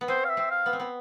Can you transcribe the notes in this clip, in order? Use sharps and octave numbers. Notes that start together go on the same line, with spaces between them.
B3
C4 C5
F5
E5
C4
F5
B3
C4
B3